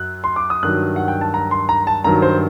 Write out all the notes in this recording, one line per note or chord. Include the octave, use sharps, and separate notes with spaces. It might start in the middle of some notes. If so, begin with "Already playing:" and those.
Already playing: F#2 F#3 F#6
C6
D6
D#6
G2 D#3 F#3 F#6
F#5
G5
A5
A#5
C6
A#5
A5
G2 D#3 F#3 A#5
C5